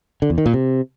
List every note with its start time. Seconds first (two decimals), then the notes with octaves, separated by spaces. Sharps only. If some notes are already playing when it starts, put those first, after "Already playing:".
0.22 D3
0.30 E2
0.38 D#3
0.46 A#2
0.53 C3